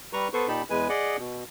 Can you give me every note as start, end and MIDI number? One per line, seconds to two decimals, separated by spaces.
0.13 0.28 55
0.13 0.28 71
0.13 0.28 82
0.13 0.28 85
0.33 0.47 59
0.33 0.47 69
0.33 0.47 71
0.33 0.47 72
0.33 0.47 85
0.48 0.62 46
0.48 0.62 63
0.48 0.62 67
0.48 0.62 81
0.48 0.62 83
0.70 0.88 40
0.70 0.88 56
0.70 0.88 71
0.70 0.88 80
0.89 1.17 68
0.89 1.17 74
0.89 1.17 75
0.89 1.17 78
1.19 1.44 47